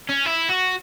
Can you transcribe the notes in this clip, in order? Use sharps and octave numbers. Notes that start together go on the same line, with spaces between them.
C#4
E4
F#4